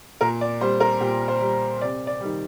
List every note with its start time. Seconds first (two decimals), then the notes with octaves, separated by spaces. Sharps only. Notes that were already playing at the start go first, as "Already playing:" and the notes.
0.21 A#2 A#4
0.41 D5
0.61 G3 C5
0.80 A#4
1.00 A#2 G4
1.28 C5
1.41 G3
1.81 C3 D5
2.07 D5
2.21 D#3 G3